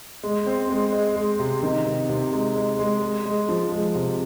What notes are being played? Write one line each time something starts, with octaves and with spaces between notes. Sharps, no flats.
G#3
C4
G#3
G#3
G#3
C3
D#3
C3
C3
G#3
G#3
G#3
G#3
G#3
F3
G#3
C3